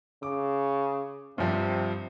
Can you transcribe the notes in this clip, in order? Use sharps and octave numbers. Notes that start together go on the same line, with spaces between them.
C#3 D6
G2 C3 F3